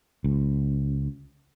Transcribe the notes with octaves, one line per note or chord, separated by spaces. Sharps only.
C#2